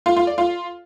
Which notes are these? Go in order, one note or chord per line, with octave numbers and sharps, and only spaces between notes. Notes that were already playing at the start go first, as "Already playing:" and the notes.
F4
F4
D5
F4